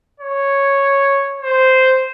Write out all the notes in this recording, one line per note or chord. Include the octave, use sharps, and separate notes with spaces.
C#5
C5